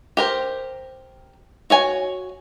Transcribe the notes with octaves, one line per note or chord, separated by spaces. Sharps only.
G4 A#4 C5
F#4 C#5 G#5